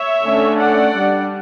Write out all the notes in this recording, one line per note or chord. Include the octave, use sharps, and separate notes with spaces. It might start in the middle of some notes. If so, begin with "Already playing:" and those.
Already playing: C#5 E5
D3 A3 C#4
D5 F#5
G3 D4